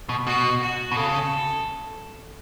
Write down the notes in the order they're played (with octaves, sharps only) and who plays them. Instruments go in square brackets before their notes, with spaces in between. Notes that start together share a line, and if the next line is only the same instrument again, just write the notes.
[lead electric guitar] B2
[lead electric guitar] B2 [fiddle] F#4
[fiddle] F#4
[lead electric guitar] B2
[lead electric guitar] C#3 [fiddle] A4